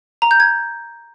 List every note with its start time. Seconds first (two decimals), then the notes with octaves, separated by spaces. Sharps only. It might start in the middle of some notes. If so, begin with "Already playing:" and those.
0.22 A#5
0.31 G6
0.40 G#6